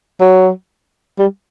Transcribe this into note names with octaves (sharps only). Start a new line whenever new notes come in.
F#3
G3